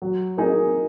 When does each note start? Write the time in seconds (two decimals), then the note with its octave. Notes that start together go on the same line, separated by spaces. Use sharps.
0.02 F#3
0.37 A#3 D#4 G#4 D#5